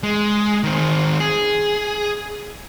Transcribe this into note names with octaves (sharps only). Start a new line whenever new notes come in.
G#3
D#3 C4
G#4